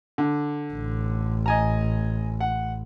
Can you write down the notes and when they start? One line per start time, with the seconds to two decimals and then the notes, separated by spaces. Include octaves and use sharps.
0.18 D3
0.73 A1
1.46 D#5 G#5 A#5
2.40 F#5